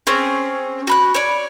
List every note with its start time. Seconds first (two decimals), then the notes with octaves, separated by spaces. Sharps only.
0.07 C4 C#4 G#4
0.87 F#4 B5 F#6
1.14 C#5 D5